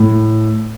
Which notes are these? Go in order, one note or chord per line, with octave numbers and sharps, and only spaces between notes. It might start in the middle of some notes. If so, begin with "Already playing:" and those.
Already playing: A2